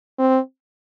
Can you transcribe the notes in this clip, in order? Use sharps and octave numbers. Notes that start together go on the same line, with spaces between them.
C4